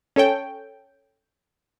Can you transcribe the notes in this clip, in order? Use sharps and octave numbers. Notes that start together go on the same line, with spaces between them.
C#4 A4 C#5 G5